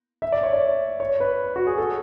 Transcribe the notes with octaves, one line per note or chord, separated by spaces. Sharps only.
E5
D5
C#5
D5
C#5
B4
F#4
G#4
A4